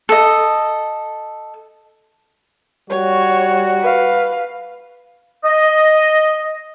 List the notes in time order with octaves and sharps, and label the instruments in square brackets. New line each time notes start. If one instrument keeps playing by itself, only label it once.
[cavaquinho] A4 D#5
[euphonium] G3 [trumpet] F#4 [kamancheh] C#5
[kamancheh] B4 F5
[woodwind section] D#5